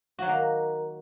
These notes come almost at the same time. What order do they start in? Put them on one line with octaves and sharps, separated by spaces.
F#4 F#3 D#3 A#3